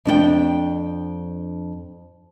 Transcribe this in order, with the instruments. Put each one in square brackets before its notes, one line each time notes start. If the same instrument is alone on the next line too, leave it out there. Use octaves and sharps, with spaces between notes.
[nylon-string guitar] F2 D4 E4 G5